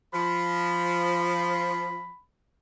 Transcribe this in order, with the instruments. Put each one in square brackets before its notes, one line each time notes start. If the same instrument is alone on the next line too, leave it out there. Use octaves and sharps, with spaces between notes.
[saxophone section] F3 [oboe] B5